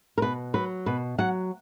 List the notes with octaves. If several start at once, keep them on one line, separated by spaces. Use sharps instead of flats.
A#4
B2 B4
F#3 B4
B2 B4
F#3 F#5